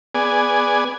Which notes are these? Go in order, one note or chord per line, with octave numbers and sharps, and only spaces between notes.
B3 G#4 D5 G#5